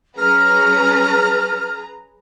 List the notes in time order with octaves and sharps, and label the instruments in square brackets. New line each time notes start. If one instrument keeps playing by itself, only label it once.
[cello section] F#3 C#4 [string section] G#4 B4 A#5 [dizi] F6